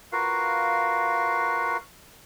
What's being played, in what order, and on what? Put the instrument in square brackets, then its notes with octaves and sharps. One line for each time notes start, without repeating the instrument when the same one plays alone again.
[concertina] F4 F#4 A#4 B4 F5